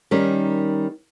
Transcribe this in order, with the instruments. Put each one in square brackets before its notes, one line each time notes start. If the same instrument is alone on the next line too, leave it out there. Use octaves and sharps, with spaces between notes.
[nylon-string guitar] D#3 G3 C#4 D#4 A#4